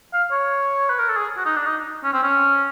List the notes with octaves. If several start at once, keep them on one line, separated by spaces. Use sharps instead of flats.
F5
C#5
B4
A#4
A4
G#4
F#4
D#4
D4
D#4
C#4
C4
C#4